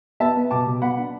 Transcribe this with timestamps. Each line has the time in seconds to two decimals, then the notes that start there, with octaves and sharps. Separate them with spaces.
0.20 B3 E5 A5
0.36 B3
0.51 B2 A5 D6
0.66 B2
0.82 B3 F#5 B5
0.97 D4